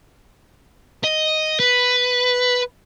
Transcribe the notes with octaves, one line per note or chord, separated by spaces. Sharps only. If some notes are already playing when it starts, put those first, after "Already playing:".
D#5
B4